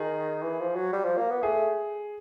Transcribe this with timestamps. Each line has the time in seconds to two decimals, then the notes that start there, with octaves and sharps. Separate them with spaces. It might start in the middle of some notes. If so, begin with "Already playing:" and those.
Already playing: D#3 G#4
0.43 E3
0.60 F3
0.76 F#3
0.93 G3
1.05 F3
1.17 A#3
1.30 B3
1.42 A3 G#4